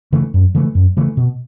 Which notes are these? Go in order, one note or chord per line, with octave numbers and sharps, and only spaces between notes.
C#3 E3 A3
F#2
C#3 E3 A3
F#2
C#3 E3 A3
B2